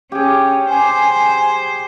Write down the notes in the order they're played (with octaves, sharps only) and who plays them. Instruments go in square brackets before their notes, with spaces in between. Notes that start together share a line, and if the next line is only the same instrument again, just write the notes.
[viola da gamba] C#4 [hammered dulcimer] G4 G#4
[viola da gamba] C5 [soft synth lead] G#5